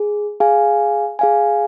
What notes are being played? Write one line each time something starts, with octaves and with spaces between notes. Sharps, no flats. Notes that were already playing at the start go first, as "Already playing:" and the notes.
Already playing: G#4
G#4 F5 G#5
G#4 F5 G#5